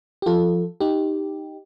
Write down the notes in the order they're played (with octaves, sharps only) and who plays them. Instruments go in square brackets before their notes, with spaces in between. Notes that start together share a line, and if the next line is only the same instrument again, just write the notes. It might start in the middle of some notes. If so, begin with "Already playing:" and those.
[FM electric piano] G4
[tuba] F3 [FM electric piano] F4 A4
[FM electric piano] D#4 G4